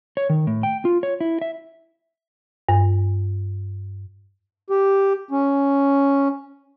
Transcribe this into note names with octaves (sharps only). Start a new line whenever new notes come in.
C#5
D#3
A2
G5
F4
C#5
E4
E5
G2
G4
C#4